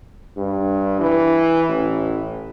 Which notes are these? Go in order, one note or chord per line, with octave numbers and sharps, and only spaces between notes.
G2
E3
A1